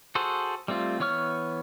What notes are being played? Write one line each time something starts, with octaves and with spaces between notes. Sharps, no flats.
F#4 G#4 A4 C5
G3 A3 C4 F4
E3 B3 C#5 C#6 F6